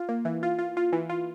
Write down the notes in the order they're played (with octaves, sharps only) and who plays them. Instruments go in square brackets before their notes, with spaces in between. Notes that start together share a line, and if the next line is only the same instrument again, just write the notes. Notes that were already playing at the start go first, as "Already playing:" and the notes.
Already playing: [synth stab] F4
A#3
E3
F4
F4
F4
E3
F4